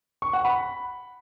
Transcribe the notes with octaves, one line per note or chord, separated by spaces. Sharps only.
C#6
F#5
B5